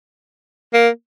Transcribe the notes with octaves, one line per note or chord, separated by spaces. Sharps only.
A#3